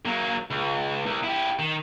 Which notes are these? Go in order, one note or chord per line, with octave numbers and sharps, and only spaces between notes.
F#3 A#3
C#2
C2
E4 G4
D#3